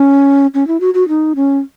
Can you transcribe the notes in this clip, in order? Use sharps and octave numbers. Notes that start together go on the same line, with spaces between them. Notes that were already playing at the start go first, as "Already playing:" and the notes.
Already playing: C#4
C#4
E4
F#4
F#4
D#4
C#4